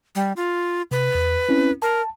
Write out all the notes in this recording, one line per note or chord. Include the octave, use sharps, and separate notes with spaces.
G3
F4
C3 B4
E2
C4 C#4 E4
A#4 A5